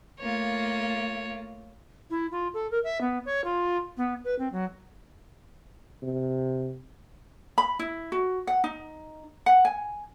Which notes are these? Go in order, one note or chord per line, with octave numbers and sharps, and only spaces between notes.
A3 A#3 F4 C#5
E4
F4
A4
A#4
E5
B3
C#5
F4
B3
B4
C4
F#3
C3
B5
E4
F#4
F#5
D#4
F#5
G#5